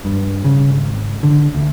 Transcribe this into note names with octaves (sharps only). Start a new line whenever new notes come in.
G2
C#3
G#1
D3
D2